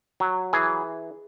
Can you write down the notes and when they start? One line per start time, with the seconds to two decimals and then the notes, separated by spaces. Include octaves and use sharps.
0.20 F#3
0.53 E3 G#4